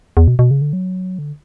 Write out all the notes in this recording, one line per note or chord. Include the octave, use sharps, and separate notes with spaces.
E2
B2
B2
C#3
D3
F#3
D3